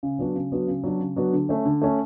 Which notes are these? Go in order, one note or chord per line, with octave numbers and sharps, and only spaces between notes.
C#3
F#3 B3 D4 F#4
C#3
F#3 B3 D4 F#4
C#3
F#3 B3 D4 F#4
C#3
F#3 B3 D4 F#4
D3
A3 C#4
D3
A3 C#4